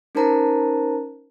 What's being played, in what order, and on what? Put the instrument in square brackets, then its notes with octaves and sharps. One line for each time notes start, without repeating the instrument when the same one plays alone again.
[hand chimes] C#4 D#4 A#4 C5 A5 A#5